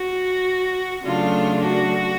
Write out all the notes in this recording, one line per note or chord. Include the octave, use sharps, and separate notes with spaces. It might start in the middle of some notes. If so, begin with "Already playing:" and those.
Already playing: F#4
C#3 F#3 A3 D4 F4
F#4